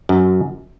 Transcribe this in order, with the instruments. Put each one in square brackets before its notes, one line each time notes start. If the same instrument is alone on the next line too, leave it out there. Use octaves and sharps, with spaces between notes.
[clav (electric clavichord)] F#2